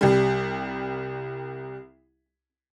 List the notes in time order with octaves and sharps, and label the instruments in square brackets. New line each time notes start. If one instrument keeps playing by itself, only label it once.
[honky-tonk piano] C2 G3